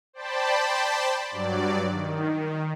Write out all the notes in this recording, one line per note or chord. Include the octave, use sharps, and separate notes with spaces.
C5 D5 G5 A5 B5
G2 F#3 D5
D#3